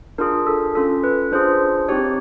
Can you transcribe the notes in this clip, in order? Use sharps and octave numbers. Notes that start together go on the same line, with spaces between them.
D4 F4 G#4 A#4
A4
C#4 F4 A4
B4
D4 F4 G#4 C5
C4 D#4 G4 C#5